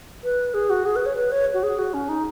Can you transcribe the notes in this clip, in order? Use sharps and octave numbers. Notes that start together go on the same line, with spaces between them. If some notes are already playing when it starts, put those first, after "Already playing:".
B4
G#4
F#4
G#4
B4
C#5
B4
C#5
F#4
G#4
F#4
C#4
D#4